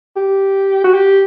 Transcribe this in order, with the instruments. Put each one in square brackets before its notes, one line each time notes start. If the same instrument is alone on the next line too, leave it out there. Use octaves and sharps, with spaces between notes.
[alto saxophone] G4
F#4
G4